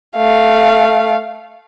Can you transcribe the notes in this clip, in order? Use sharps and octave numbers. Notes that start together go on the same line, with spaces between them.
A3 F5